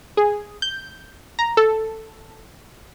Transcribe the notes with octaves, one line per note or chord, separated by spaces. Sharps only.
G#4
G6
A#5
A4